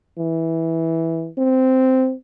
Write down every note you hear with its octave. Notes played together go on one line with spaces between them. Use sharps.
E3
C4